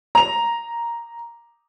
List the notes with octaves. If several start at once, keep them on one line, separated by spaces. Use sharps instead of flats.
A#5 F7